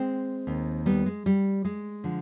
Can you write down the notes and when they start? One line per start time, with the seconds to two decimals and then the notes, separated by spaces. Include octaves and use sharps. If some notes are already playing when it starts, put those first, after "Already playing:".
Already playing: G#3 C4
0.47 D#2 D#3
0.86 G3 B3
1.06 G#3
1.26 G3
1.65 G#3
2.04 D3 F3